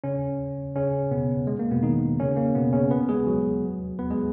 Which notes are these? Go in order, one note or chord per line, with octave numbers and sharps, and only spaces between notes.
C#3 C#4
C#3 C#4
B2 B3
G#3
A#3
B2 B3
D#3 D#4
C#3 C#4
A#3
B2 B3
C#3 C#4
B3 B4
G#3 G#4
F#3 F#4
B3 B4
G#3 G#4